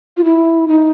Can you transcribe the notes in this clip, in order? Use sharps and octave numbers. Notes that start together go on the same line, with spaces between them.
F4
E4
D#4